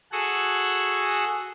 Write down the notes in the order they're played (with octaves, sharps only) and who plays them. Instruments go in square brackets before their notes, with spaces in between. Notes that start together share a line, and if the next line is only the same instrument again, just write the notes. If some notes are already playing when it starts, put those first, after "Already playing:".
[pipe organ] F#4 G#4 A4 F#5